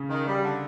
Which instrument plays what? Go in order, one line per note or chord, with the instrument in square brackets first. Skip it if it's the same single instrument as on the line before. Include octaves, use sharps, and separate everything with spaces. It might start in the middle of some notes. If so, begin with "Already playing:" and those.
Already playing: [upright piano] C#3 C#4
[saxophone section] D#3
G3
D3